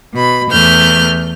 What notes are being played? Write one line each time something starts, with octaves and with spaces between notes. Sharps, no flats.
B2 B5
E2 A3 F6 G6